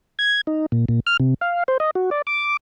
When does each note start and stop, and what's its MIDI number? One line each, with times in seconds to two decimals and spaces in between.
0.19 0.41 92
0.47 0.66 63
0.72 0.85 46
0.89 1.00 46
1.07 1.17 89
1.20 1.34 48
1.41 1.63 77
1.68 1.78 72
1.80 1.91 75
1.95 2.10 66
2.11 2.22 74
2.27 2.57 86